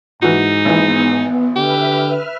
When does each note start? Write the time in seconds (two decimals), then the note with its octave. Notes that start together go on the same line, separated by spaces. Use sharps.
0.22 G#2 E3 D#4 F#4
0.65 G#1 E3 B3
1.56 D3 G4 B4 E5 F6